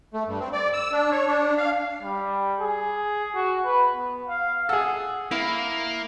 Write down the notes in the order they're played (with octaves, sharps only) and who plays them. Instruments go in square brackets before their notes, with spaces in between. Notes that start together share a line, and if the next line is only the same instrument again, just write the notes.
[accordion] A3
G2
C4
D5
E6
D4
C#5
D4
F5
[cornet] G3
G#4
F#4
B4
B3
F5
[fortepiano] G#4 A4 [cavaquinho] F#5
[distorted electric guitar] A#3 [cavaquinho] E4 F5 B5